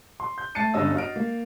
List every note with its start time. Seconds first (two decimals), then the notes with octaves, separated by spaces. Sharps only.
0.20 C6
0.38 G6
0.55 A3 A5 A6 C7 C#7 D#7
0.74 G1 G2 B3 C#4 D#5 E6
0.94 F#4 D#5 F6 D7
1.16 A#3